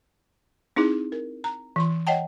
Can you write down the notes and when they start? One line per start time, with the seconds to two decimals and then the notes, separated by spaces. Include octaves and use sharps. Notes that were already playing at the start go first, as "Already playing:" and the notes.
0.76 C4 D#4 E4 G#4
1.12 A#4
1.44 A#5
1.76 E3 C6
2.07 C#5 D#5 F#5 G5 A5